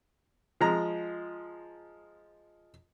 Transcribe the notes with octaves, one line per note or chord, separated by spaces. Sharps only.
F3 G#3 A#5